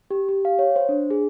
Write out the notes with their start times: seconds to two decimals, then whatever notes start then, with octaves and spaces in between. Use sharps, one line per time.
0.11 G4
0.29 G4
0.45 F5
0.59 C#5
0.76 C5
0.89 D4
1.10 G#4